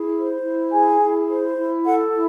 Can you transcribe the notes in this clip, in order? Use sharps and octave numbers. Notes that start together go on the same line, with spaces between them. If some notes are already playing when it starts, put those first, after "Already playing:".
Already playing: E4 G#4
C5
E4
G#4 G#5
E4
C5
E4
A4 F#5
E4